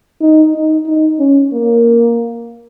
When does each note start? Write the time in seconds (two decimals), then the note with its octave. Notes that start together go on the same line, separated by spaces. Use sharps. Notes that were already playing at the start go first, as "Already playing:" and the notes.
0.21 D#4
0.54 D#4
0.86 D#4
1.19 C#4
1.53 A#3